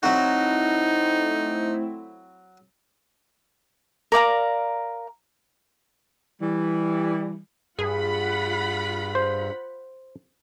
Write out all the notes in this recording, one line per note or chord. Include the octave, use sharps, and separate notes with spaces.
F#3 A3 C4 D#4 E4 F#4
A#4 D5 F5 A#5
E3 G3
G2 F4 G#4 F#5 B5
C5